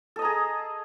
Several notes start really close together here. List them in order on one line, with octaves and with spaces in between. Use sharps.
A4 D#5 A#5 G#4